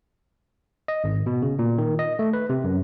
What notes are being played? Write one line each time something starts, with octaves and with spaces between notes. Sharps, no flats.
D#5
G#1
B2
C#3
A#2
D#3
D#5
A3
B4
C3
F#2